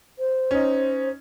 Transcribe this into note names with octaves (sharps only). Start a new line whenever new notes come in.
C5
C#4 D#4